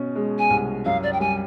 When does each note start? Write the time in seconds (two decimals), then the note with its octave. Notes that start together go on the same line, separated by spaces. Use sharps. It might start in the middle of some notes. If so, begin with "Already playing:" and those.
Already playing: B2 C#4
0.16 G#3
0.39 G#5
0.50 C2
0.85 F#2 F5
1.03 D5
1.13 G5
1.20 G3 G#5